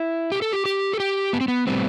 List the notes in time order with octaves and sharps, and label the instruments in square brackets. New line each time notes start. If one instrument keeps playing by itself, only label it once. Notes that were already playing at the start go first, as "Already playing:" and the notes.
Already playing: [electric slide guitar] E4
G4
A4
G4
G4
A4
G4
B3
C4
B3
A2 G3 B3 C4